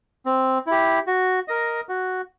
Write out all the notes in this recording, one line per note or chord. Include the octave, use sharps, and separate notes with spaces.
C4
E4 G4
F#4
A#4 D#5
F#4